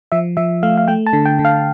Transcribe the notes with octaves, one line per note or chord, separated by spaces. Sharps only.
F3 E5
F3 E5
A3 F5
F5
A3 G5
A5
D3
G5
D3
F5